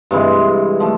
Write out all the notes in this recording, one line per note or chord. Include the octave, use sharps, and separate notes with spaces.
G2 C3 E3 G#3
F3 A3